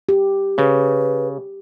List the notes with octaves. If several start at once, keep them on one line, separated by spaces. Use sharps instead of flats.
G4
C#3 B4